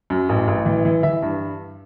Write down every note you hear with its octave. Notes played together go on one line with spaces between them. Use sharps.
F#2
A1
A1
E3
E3
E3 E5
G2